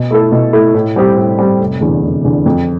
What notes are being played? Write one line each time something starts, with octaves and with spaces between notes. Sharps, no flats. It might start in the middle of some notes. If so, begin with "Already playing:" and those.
Already playing: B2
A3 E4 A4
B2
A3 E4 A4
A2
G3 C4 G4
A2
G3 C4 G4
F1
E2 D3
F1
E2 D3
F2